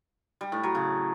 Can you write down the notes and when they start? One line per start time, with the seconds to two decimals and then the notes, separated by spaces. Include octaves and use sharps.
0.41 G3
0.52 A2
0.63 F#3
0.75 C#3